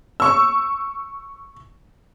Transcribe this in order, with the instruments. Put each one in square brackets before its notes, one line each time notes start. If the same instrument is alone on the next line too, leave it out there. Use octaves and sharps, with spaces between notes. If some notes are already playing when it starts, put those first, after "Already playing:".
[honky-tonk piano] C#6 E6